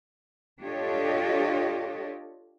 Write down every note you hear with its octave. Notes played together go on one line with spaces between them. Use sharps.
D4 F4 G4 A4 C#5 D#5